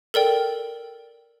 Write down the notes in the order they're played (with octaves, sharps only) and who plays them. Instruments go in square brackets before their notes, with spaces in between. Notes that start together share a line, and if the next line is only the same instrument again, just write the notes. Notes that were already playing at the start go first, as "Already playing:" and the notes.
[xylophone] A4 A#4 D5 G5